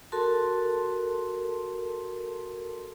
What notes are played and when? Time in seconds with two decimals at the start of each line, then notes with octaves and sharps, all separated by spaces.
0.12 F#4 A4 A#4 A5 C6